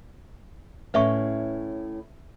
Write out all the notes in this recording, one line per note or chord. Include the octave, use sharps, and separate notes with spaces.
A2 C#4 B4 E5 C#6